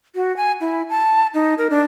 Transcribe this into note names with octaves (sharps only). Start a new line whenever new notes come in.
F#4
G#5
E4
A5
D#4
A#4
D4